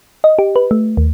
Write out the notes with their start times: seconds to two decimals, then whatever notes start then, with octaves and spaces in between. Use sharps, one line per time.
0.24 D#5
0.39 G4
0.56 B4
0.71 A3
0.97 D#2